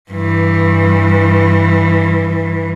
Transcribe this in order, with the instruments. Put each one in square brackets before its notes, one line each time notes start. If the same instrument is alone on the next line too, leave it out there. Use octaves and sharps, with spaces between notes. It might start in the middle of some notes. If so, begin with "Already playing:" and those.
[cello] G2 E3